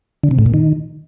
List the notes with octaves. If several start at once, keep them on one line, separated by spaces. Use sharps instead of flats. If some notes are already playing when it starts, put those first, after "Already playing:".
D3
C3
A2
A#2
D#3